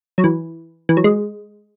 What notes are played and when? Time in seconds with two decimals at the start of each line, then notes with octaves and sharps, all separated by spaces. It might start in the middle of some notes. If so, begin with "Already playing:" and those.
0.18 F#3
0.24 E3
0.89 E3
0.97 F#3
1.04 G#3